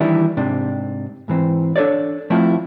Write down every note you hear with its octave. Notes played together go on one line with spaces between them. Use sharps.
D#3 E3 G3 D4 E4
G#2 C3 D4
G#2 E3 C4
D4 A4 A#4 C#5 D5
F3 A3 C4 E4 F4